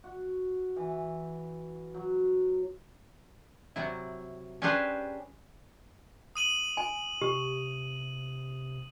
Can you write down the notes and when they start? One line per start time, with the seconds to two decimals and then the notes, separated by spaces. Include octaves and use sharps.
0.04 F#4
0.76 E3
1.94 F#3
3.76 C3 F#3 E4
4.62 C#4 D4 G4 G#4 B4 C5
6.36 D#6 D#7 F#7
6.77 G#5
7.21 C3 G4